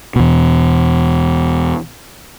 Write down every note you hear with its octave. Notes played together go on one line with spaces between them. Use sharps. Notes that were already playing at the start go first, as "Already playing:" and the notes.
E2 B2